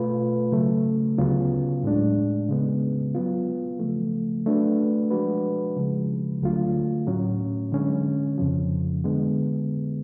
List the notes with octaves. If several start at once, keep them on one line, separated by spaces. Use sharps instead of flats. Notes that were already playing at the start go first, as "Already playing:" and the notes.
Already playing: B2 A3 F4 B4
C#3 F#3 A3
D2 C#3 F#3 B3 F4
A2 G#3 D4
C#3 G#3 B3
F#3 B3 F4
C#3 F3 A3
F#3 A3 D4 F#4 B4
F3 G#3 D4 F#4 B4
C#3 F3 G#3
D2 D3 F#3 A3 F4
A2 F#3 C#4
D3 G#3 C#4
F2 C#3 F3
D3 G#3 B3